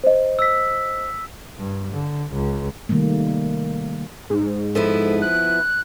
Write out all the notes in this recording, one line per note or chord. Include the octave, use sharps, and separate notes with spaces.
C5 D#5
E6 B6
G2
D3
C#2
C3 D#3 G3 A3 A#3
G#2
F3 B3 E4 A4
F#6